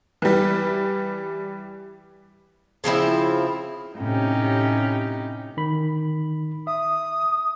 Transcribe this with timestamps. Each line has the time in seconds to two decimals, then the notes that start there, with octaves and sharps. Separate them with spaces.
0.22 E3 G3
2.84 C#3 F3 C4 E4
3.98 A2 C3 C#4 D#4 G4
5.57 D#3 B5
6.67 E5 D#6